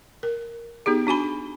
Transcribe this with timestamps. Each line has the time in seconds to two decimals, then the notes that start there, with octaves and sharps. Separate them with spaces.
0.23 A#4
0.86 B3 D#4 G4 G#4
1.07 D4 F#4 G#5 B5